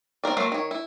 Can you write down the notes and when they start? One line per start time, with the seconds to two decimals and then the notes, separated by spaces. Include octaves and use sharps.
0.24 C4 D#4 A#4 D5
0.37 F#3 A3 A#3 F4
0.52 D#3 C#5
0.71 E4